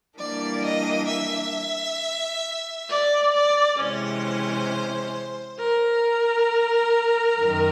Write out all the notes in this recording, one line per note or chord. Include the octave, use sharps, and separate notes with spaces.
E3 G3 A#3 D4 D5
D#5
E5
D5
D5
C3 E3 G#3 C#4 C5
A#4
F#2 D#3